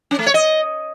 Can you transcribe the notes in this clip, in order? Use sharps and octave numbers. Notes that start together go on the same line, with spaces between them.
C#4
A3
C#5
D#5